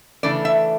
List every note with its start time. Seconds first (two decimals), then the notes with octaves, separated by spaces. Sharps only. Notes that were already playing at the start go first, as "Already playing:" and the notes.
0.23 C#3 E3 A3 D4 D5
0.45 E5